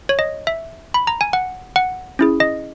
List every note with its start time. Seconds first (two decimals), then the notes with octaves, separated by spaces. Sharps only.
0.09 C#5
0.19 D#5
0.47 E5
0.94 B5
1.07 A#5
1.21 G#5
1.33 F#5
1.76 F#5
2.19 C#4 E4 G#4
2.40 D#5